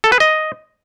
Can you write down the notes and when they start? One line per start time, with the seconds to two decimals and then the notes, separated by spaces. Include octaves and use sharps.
0.04 A4
0.12 B4
0.20 D#5